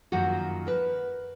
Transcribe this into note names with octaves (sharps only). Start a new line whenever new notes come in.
F#2 D#3 F3 A#3 F#4
A#4 B4